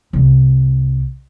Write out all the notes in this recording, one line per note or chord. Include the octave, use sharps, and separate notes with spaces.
C2